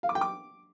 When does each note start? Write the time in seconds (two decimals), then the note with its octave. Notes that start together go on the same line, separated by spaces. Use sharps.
0.03 F5
0.09 D6
0.15 G5
0.21 D6